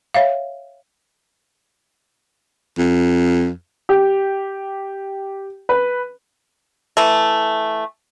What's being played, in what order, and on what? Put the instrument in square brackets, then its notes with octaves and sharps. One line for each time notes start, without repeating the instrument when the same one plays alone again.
[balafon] C#5 E5 F5
[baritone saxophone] F2
[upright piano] G4
B4
[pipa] E3 A3